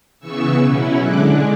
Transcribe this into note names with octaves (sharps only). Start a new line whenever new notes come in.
C#3 E3 B3 C#6 E6
B2 F#3 C#4 E4
D3 G#3 D4 D6 F#6